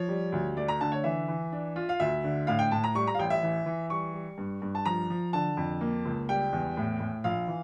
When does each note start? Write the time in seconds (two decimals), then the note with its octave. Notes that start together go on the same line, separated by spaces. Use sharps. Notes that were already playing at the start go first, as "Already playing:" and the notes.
Already playing: F3 C#5
0.08 G3
0.32 D2
0.57 A3 D5
0.68 A#5
0.81 D3 A5
0.92 C#5
1.04 E3 E5
1.28 E3
1.52 D4
1.76 F4
1.89 F5
2.00 D2 E5
2.24 D3
2.47 A2 F5
2.59 G5
2.72 A2 A5
2.84 A#5
2.95 G3 C#6
3.07 A#5
3.14 F5
3.19 A1 G5
3.30 E5
3.43 E3
3.66 E3
3.90 G3 C#6
4.14 G3
4.38 G2
4.62 G2
4.75 A5
4.85 F3 A#5
5.10 F3
5.33 D3 A5
5.57 F2
5.81 A#3
6.05 C#2
6.29 G3 G5
6.53 E2
6.77 A2
7.00 A2
7.24 A#1 F5
7.48 E3